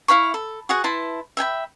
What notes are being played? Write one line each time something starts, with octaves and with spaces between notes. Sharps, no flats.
E4 F5 B5 C#6
A4
F#4 G#4 F#5
E4 B4 A5 C6
E5 G5 G#5 B5